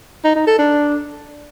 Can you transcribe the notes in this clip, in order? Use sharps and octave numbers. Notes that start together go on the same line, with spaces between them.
D#4
D#4
A4
D4